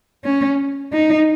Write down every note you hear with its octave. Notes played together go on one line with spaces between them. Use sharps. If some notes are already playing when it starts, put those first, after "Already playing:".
C#4
D#4